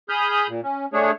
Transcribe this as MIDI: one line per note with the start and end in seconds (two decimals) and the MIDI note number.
0.09 0.47 68
0.09 0.47 83
0.09 0.47 87
0.09 0.47 89
0.09 0.47 91
0.48 0.61 46
0.64 0.86 61
0.93 1.11 57
0.93 1.11 62
0.93 1.11 68
0.93 1.11 73